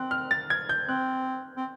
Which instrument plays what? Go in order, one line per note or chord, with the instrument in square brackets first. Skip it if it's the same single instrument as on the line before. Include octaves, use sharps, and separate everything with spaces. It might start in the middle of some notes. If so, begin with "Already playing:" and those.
Already playing: [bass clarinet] C4 [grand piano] F#6
[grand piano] F6
A6
G#6
G6
[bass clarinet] C4 [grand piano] F#6
[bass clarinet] C4